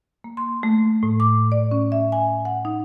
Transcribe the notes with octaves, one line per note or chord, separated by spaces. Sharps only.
A#3
C6
A3
A2
D6
D5
C#4
E5
G#5
F#5
D#4